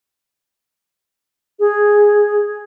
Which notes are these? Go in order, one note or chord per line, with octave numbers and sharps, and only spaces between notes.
G#4